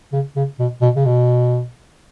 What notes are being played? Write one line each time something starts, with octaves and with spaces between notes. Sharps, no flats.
C#3
C#3
B2
B2
C#3
B2